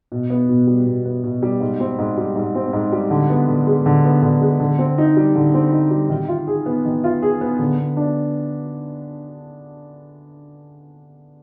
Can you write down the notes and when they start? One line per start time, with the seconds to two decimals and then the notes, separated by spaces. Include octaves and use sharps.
0.12 B2
0.30 B3
0.49 B2
0.67 G3
0.86 B2
1.05 B3
1.23 B2
1.43 G3
1.60 G#2
1.80 C4
1.99 G#2
2.17 G3
2.36 G#2
2.55 C4
2.73 G#2
2.92 G3
3.11 D3
3.30 B3
3.48 D3
3.67 G#3
3.86 D3
4.05 B3
4.23 D3
4.41 G#3
4.60 D3
4.79 C4
4.98 D#4
5.17 G3
5.36 D3
5.54 C4
5.72 D#4
5.91 G3
6.10 D#3
6.28 F4
6.47 G#4
6.66 B3
6.85 D#3
7.04 F4
7.22 G#4
7.41 B3
7.59 D3
7.78 B3
7.97 D4